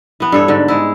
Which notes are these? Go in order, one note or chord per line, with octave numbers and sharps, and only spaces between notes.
E3 B3
G2 A4 C#5
G#2 D3
G#3 E4